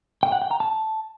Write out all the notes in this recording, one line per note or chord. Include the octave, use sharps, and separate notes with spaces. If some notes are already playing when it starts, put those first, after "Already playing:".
G5
F#5
G5
A#5
A5